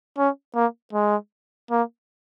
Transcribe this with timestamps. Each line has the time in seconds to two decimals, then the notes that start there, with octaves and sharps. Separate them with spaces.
0.18 C#4
0.55 A#3
0.93 G#3
1.71 A#3